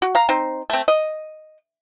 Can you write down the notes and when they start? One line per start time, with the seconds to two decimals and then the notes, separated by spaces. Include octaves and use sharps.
0.02 F#4
0.15 F5 A#5
0.29 C4 D#4 C5
0.70 A3 C4
0.88 D#5